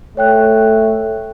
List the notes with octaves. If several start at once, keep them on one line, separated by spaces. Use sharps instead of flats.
A3 C#5 G5 F#6